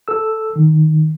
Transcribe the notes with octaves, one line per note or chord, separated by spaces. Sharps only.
A4 E6
D#3